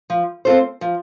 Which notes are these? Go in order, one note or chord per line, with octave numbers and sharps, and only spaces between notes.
F3
C4 F4 A4 C5
F3